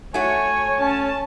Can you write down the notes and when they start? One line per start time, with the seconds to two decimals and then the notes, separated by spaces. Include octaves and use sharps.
0.14 A3 F#4 C#5 G#5
0.81 C#4 A5